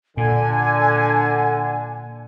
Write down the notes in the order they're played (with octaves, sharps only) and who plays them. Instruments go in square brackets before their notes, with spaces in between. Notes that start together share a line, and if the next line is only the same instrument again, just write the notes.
[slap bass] A#2 [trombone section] D3 [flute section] G#5